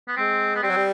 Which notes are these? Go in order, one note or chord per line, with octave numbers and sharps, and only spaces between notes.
B3
G#3 C4
B3
G3 C4
F#3
G3